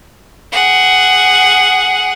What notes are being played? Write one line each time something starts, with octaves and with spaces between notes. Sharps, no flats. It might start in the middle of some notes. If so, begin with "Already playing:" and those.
G#4 F#5